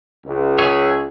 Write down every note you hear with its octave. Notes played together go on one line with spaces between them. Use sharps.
C#2
G#4 C#5 E5